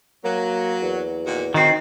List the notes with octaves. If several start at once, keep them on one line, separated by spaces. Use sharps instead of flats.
F#3 A#3
E2
A#2 D#3 F#4
D#3 C4 D#4 F#4